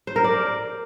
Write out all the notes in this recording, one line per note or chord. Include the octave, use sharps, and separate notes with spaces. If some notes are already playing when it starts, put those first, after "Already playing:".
C5
A#4
D5